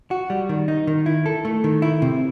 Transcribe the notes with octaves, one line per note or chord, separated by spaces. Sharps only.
F#4
G3
D#3
D#4
D#3
E4
A4
A3
D#3
E4
C3